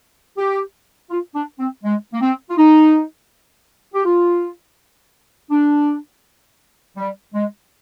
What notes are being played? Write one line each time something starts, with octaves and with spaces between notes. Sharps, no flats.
G4
F4
D4
C4
G#3
A#3
C4
F4
D#4
G4
F4
D4
G3
G#3